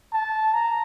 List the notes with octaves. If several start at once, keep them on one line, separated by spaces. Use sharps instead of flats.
A5
A#5